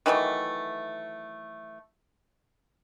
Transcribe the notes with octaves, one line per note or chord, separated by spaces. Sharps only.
D#3 E3 F#3 A3